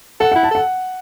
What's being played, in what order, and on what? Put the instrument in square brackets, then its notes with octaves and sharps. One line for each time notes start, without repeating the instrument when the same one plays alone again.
[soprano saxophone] A4 [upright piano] F#5
[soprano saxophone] E4 [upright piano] F#5
[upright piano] A5
[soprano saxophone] A4 [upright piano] F#5